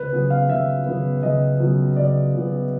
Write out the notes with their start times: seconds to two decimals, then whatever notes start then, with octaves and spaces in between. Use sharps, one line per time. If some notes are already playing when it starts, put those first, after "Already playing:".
Already playing: C#2 B4
0.13 C#3 F#3 B3
0.30 F5
0.49 C#2 E5
0.86 C#3 F#3 B3
1.23 C#2 D#5
1.60 C#3 F#3 B3
1.96 C#2 D5
2.34 C#3 F#3 B3